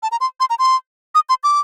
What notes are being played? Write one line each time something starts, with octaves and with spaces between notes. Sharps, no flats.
A5
A#5
C6
C6
A#5
C6
D#6
C6
D6